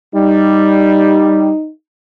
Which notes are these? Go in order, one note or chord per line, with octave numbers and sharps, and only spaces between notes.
G3 D#4